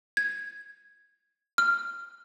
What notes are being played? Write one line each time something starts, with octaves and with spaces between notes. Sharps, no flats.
G#6
F6